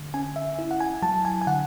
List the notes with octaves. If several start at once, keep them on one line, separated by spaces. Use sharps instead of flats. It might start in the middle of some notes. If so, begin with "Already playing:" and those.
Already playing: D3
C#4 G#5
E5
E4
F#5
G#5
F#3 A5
G#5
G#5
D3 F#5